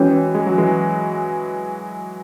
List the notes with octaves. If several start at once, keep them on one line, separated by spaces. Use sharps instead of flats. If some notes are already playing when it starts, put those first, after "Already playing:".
Already playing: E3 G#3 C#4 F#4 C#5
G#3
F#3
E3 G#3